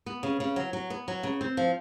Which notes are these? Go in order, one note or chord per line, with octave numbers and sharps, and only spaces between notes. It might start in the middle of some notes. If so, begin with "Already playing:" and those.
B3
C#3
C#3
F#3
F#3
B3
F#3
C#3
C4
F3